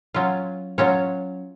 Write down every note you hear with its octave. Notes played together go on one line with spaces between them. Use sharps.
F#3 C#4 F4
F#3 C#4 F4 C#5